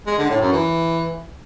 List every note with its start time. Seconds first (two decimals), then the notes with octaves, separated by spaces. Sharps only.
0.07 G#3
0.18 D3
0.29 A2
0.41 F#2
0.52 E3